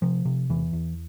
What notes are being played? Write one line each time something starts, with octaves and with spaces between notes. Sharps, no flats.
C3 F3
C3
E2 E3
E2